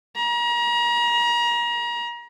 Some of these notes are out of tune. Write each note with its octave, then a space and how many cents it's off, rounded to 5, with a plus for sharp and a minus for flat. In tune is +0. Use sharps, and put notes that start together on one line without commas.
A#5 +35